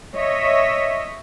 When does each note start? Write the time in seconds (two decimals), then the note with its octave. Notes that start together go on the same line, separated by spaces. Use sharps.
0.16 C#5 D#5 E5